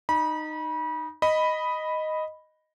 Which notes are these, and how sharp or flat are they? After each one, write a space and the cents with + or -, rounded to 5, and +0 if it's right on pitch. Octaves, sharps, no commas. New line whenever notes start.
D#4 -15 B5 -35
D#5 +0 B5 +0